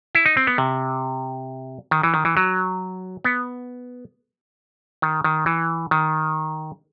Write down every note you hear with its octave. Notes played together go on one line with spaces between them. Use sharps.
E4
D#4
C4
B3
C3
D#3
E3
D#3
E3
F#3
B3
D#3
D#3
E3
D#3